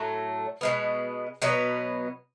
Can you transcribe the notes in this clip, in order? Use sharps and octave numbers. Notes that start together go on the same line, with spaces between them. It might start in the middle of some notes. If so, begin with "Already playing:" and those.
Already playing: A2 F#3 A3
B2 G#3 B3
B2 F#3 B3